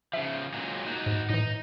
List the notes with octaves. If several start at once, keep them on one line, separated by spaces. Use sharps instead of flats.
C#3 F3 E5
A#2 F#3 G#3
D#4 F#4
G#2
A2 E3 D#4